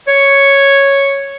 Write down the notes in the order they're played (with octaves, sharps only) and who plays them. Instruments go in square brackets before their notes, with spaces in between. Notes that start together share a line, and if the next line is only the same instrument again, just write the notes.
[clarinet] C#5